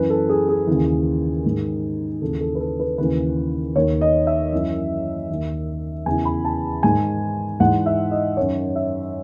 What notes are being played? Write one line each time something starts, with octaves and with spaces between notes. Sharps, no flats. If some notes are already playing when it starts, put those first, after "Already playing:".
Already playing: F#2 E3 B4
A4
G#4
G#4
D#2 C#3 E3
G#2 D#3
D#2 C#3 E3 A4
A4
B4
A4
B4
D#2 C#3 E3 B4
D#2 D#3 C#5
D#5
E5
F#2 E3
D#2 D#3
E2 C#3 E3 G#5
B5
A5
G#2 D#3 G#5
G#2 E3 F#5
E5
D#5
F#2 D#3 C#5
E5